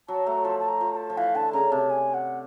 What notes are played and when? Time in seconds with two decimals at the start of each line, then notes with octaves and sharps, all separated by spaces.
0.08 F#3 A5
0.26 A3 A#5
0.44 F3 A5
0.60 A5
0.68 A#5
0.81 F3
0.92 A#5
0.97 A5
1.10 F3
1.17 E3 F5
1.35 D3 A5
1.53 C#3 A#5
1.71 C3 A5
1.90 G#5
2.14 F#5